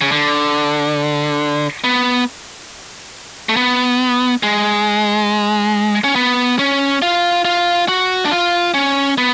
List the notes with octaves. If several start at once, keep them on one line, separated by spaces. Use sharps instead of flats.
C#3
D3
B3
A3
B3
G#3
C#4
B3
C#4
F4
F4
F#4
D4
F4
C#4
B3